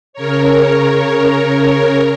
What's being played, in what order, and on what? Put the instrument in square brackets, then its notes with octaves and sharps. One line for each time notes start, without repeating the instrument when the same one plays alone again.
[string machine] C#3 A#4 C#5